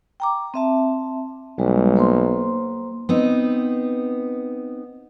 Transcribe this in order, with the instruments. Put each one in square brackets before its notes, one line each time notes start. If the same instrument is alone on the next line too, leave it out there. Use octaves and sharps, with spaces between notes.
[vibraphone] G5 A#5 D6
C4 E5 A5
[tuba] B1 [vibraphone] G3 G#3
[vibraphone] A#3 C5 C6
[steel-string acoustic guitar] B3 C4 D#4